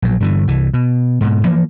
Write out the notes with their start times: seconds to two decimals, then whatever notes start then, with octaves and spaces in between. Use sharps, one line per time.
0.02 A#1 F#3
0.20 G2 D3 E3
0.48 C2 E3
0.74 B2
1.21 G#2 B2
1.45 E3 F3 A#3